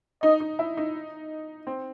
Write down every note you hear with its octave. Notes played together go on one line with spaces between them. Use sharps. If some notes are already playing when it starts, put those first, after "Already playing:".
D#4 D#5
D#4
E4
D#4
C4